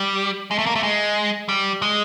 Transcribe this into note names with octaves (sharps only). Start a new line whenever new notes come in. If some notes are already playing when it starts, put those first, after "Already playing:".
Already playing: G3
G#3
A3
A#3
A3
G#3
G3
G#3